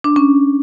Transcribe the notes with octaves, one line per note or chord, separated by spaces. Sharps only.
D4
C#4